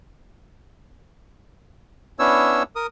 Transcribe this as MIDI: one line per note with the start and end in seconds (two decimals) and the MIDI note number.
2.19 2.63 59
2.19 2.63 61
2.19 2.63 62
2.19 2.63 64
2.19 2.63 73
2.19 2.63 88
2.76 2.87 70
2.76 2.87 87